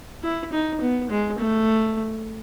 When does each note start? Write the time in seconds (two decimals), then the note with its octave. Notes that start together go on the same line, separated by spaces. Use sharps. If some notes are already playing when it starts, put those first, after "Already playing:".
0.23 E4
0.52 D#4
0.81 B3
1.10 G#3
1.39 A3